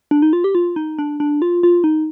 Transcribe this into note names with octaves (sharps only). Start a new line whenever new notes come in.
D4
D#4
F4
G4
F4
D#4
D4
D4
F4
F4
D#4